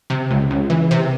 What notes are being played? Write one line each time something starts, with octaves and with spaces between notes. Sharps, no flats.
C3
C#2
C#2
E3
C3